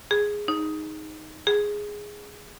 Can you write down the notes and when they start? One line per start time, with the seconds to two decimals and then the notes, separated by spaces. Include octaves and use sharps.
0.11 G#4
0.48 D#4
1.47 G#4